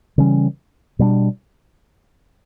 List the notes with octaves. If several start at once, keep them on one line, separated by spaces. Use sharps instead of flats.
C#3 E3 G3 C#4
B2 G3 B3 D4